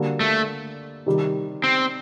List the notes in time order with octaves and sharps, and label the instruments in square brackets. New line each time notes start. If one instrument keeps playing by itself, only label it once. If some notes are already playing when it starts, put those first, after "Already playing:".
Already playing: [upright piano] D3 G3 A#3 F#4 A4
[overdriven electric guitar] A3
[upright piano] C3 D#3 G3
[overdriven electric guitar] C4